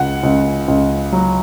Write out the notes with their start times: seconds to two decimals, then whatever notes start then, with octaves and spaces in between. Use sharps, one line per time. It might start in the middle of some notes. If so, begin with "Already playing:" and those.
Already playing: C#2 F#5
0.23 C#2
0.68 C#2
1.12 F#3